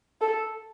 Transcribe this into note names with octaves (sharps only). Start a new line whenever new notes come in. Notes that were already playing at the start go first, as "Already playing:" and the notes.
A4